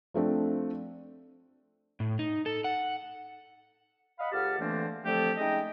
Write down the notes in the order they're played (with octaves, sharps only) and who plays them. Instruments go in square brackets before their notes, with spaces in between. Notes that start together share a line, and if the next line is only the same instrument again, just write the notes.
[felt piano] F3 A3 C4 D4
[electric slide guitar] A2
D#4
A4
F#5
[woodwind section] D#5 F5 F#5 B5
C#2 G4 A4 F#5 A5 F6
D3 E3 A3 A#3 C4 D4
D3 F3 A3 C4 G4 A4
G#3 A3 C#4 D#4 D#5 G5